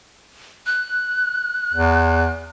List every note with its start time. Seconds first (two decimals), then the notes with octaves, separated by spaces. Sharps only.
0.66 F#6
1.73 E2